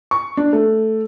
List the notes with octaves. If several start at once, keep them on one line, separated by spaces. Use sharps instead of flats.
C#6
D4
A3